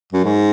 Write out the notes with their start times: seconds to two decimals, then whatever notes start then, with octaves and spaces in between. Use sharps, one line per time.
0.12 F#2
0.24 G#2